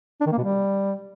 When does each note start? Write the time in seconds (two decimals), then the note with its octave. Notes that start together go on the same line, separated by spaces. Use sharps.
0.21 D4
0.26 D#3
0.32 A#3
0.38 B2
0.43 G3